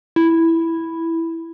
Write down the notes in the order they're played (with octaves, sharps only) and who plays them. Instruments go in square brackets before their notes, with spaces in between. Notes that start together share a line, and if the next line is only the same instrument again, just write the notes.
[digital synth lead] E4